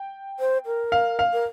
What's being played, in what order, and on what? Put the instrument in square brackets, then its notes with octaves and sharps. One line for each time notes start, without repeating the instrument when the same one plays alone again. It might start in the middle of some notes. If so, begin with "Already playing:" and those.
Already playing: [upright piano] G5
[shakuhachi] C5
A#4
[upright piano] F5
F5
[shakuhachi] A#4